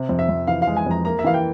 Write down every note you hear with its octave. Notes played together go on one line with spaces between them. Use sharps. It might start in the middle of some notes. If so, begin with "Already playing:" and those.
Already playing: C3
F2
E5
F2
E3 F5
F5
G#3
G#5
F2 A#5
A#3 A#5
E5
E3 F5
G5